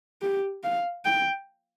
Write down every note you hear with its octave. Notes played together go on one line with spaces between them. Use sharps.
G4
F5
G5